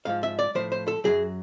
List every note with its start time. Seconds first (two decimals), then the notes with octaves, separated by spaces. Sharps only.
0.05 G#2 F3 F5
0.23 E5
0.39 D5
0.55 A2 F3 C5
0.72 C5
0.88 A4
1.04 F#2 D#3 F#3 G#4